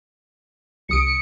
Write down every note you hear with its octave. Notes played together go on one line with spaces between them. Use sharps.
C2 D#6 C#7 D7